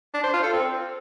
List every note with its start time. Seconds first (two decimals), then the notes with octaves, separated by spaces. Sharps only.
0.14 D4
0.24 C5
0.33 F4
0.43 A4
0.53 C4